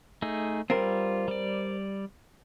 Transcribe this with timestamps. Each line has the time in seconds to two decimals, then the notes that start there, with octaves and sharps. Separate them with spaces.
0.22 A3 D#4 G#4
0.70 G3 C4 F4 A#4
1.28 G3 D5